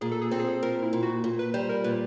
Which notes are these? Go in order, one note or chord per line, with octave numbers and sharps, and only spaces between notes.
A#2 G#4
A4
G#4
C4 A4
G#4
A4
A#2 A#4
E4
A#2
F#4
A#2
B4
G3 C5
A#4
A#2 B4